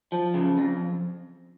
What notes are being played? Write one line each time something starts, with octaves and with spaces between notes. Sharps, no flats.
F3
C#3
F2